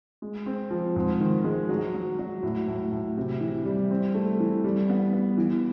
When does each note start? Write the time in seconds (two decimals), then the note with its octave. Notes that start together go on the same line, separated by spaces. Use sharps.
0.22 G#3
0.46 C4
0.70 F3
0.96 G#2
1.20 D#3
1.44 G#3
1.69 F#3
1.94 F#3
2.19 F#3
2.43 A2
2.67 A2
2.92 A2
3.17 C3
3.41 E3
3.65 G3
3.91 C4
4.14 A3
4.40 E3
4.64 G3
4.89 B3
5.13 B3
5.38 E3